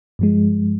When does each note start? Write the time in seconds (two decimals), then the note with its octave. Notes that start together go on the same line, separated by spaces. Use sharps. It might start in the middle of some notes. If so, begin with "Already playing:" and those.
0.19 G2 F3 G#3